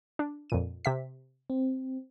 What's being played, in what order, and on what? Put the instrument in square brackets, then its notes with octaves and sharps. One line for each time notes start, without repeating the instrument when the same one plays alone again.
[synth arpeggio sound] D4
F2 A#2 D#7
C3 E5 B6
[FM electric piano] C4